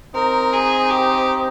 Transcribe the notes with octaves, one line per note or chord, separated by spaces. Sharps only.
C4 D#4 A#4
G#4
G4